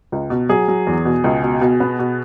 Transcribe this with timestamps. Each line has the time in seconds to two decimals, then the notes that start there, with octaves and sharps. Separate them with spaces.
0.12 C#2
0.30 B2
0.49 F#3 G#4
0.68 F#3
0.87 E2
1.05 B2
1.24 C#2
1.43 B2
1.61 B2
1.80 B3
1.99 B2